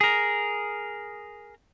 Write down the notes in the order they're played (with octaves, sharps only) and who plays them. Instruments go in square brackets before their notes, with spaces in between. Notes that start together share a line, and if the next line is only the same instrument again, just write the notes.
[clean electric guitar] G#4 A#4